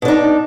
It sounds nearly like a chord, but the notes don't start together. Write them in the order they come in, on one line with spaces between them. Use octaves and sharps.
B2 D4 D#4